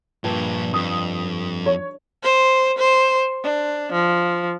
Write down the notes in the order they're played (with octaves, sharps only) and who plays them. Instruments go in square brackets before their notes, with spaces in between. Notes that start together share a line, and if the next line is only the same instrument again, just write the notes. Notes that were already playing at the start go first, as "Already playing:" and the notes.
[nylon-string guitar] G2 [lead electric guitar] A#2 F3
[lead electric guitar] F2 [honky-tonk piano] D#6
[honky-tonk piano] C#5
[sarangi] C5
C5
D4
F3